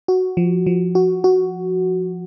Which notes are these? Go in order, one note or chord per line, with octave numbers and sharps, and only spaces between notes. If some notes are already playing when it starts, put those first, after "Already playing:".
F#4
F3
F3
F#4
F#4